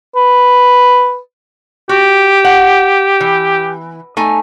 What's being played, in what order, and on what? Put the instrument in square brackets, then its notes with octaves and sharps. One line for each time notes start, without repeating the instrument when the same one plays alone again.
[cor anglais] B4
[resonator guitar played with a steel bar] F#4 [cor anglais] G4
[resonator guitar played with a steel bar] F#5
E3
A3 D#4 G#5